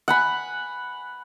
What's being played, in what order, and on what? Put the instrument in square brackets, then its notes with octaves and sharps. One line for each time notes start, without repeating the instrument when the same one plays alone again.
[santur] F#5 G#5 B5